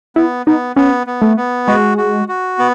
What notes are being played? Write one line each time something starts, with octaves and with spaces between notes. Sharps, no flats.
B3 E4
B3 D#4
B3 C#4
B3
A3
B3
G#3 F#4
F#4
F#4
B3